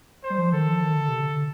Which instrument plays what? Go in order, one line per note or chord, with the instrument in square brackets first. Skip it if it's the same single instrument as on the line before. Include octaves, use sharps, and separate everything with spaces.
[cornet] C5
[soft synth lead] G3
F3
[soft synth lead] D#3 [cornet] A4
[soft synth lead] F3
D#3
D3
C3
D3